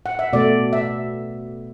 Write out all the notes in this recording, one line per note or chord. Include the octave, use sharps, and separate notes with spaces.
F#5
E5
B2 A3 D5
E5